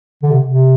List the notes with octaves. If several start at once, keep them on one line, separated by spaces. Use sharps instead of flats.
D3
C3
C3